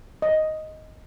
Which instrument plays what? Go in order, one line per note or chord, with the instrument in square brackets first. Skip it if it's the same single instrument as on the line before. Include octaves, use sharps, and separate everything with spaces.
[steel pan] D#5